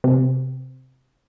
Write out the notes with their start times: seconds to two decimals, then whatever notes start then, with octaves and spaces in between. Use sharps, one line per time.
0.04 C3